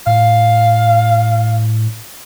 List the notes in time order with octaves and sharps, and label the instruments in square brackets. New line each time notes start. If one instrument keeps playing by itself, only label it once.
[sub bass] A2 [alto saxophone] F5